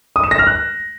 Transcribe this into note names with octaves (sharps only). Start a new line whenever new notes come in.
D#6
E7
A#6
F6
F#6